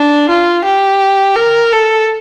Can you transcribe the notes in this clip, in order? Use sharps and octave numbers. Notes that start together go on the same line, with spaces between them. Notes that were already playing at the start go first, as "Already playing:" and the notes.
Already playing: D4
F4
G4
A#4
A4